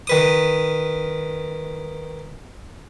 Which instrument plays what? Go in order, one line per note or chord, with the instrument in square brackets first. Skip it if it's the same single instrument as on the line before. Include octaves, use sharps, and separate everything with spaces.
[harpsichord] D#3 B4 D#6